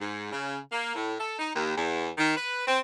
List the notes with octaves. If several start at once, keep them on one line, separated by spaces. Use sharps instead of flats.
G#2
C#3
A#3
A2
A4
D#4
D#2
E2
D#3
B4
C4